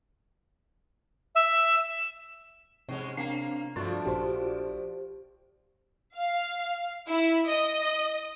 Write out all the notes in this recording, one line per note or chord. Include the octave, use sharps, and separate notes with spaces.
E5
E7
G#2 C3 G#3 C#4
A#3 C4 D4 F5
G2 F3 A3 D4 F4 F#4 D5
A#1 G4 C5
F5
E4
D#5